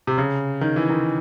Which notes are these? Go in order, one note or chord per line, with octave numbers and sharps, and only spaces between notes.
C3
C#3
D#3
E3
D#3